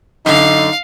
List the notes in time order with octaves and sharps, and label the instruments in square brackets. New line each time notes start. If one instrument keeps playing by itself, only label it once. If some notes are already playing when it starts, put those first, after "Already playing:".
[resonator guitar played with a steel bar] F#2 D3 [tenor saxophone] D#4 [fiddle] F5